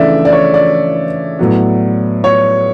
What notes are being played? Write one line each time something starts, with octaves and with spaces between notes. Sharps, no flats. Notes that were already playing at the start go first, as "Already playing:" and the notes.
Already playing: C#3 E3 A3 D4 D5 E5
D5
C#5
D5
A2 F#3 B3
C#5